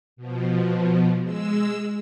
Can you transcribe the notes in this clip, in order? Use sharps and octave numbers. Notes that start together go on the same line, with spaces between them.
B2 F3
G#3 E6